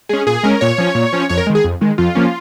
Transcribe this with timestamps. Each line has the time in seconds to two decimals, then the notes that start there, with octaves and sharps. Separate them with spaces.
0.09 G#3 C#4 G#4
0.27 A#2 G#4
0.43 G#3 C#4 A#4
0.61 A#2 C#5
0.78 F3 C#4
0.95 A#2
1.13 F3 C#4
1.29 F2 C#5
1.38 A#4
1.47 D#3 G#3
1.55 G#4
1.64 F2
1.81 D#3 G#3
1.98 F2 F4
2.15 F3 A#3 C#4